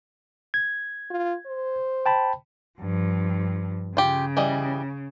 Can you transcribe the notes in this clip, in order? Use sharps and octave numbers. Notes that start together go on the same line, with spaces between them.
G#6
F4
C5
G5 A5 B5
G2 F3
C#3 F4 G4
E3 G3 D#5